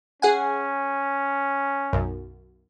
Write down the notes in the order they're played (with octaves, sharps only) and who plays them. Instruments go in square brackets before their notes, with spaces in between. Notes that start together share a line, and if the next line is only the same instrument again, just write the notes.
[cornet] C#4 [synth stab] G#4 F#5 G#5
[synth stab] B1 F#2